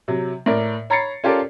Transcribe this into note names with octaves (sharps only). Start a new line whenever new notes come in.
C3 F#3
A2 A#4 D5
C#5 A#5 B5 A6 C7 C#7
C#4 F4 G4 A4 A#4 D5